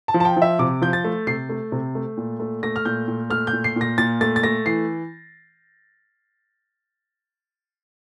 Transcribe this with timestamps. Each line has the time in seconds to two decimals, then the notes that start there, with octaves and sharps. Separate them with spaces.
0.08 A5
0.14 F3
0.20 A5
0.25 G5
0.37 F3
0.42 E5
0.59 C3 D6
0.82 F3 G6
0.93 A6
1.04 A3
1.27 C3 C7
1.49 A3
1.72 C3
1.95 A3
2.17 A#2
2.40 A3
2.63 A3 A#6
2.76 F6
2.85 A#2 G6
3.08 A#2
3.30 A3 F6
3.47 G6
3.53 A#2
3.64 C7
3.76 A#2 A#6
3.98 A#2 A6
4.21 A3 A6
4.36 A6
4.43 A3 A#6
4.65 E3 C7